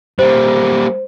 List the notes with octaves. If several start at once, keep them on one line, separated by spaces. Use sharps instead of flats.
G3 A#3 C5